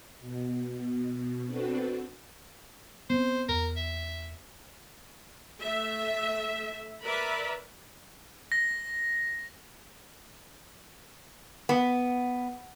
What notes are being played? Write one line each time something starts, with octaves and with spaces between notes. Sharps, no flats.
B2
C4 D4 F#4 A4 B4
B3 C4 C5
E2 A#4
E5
A3 E5
A#4 B4 D5 E5 B5
A#6
B3